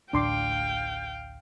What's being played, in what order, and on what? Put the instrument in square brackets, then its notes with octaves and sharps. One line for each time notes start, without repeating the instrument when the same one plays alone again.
[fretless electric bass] A1 D2 A2 [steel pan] D4 C6 D6 [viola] F5 G5